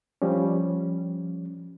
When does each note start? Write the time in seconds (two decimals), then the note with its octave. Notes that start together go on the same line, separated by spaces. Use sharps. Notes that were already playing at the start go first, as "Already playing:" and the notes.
0.22 F3 G3 C#4